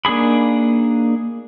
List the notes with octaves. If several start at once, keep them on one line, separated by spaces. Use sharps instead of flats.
A#3 D4 D#4 G#4 B5